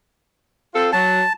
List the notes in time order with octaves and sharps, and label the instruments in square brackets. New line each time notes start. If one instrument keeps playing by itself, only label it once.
[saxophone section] C4 F4 A4
[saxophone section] F#3 [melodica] A5